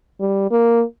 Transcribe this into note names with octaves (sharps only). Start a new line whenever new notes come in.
G3
A#3